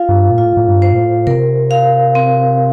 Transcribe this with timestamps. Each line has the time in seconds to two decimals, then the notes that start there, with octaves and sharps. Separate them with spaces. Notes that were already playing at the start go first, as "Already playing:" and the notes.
Already playing: F4 F5
0.09 G2
0.30 A#2
0.38 A2 F4
0.57 A2
0.68 G2
0.82 C5
0.93 A#2
0.97 A2
1.27 C3 A#4
1.71 F5
2.15 C4